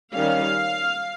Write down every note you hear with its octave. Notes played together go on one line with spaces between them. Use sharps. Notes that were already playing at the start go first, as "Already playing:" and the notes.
D#3 G3 C#4 F5